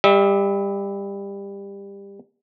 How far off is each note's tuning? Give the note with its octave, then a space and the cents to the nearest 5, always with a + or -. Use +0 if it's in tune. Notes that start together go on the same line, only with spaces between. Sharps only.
G3 +20 E5 -30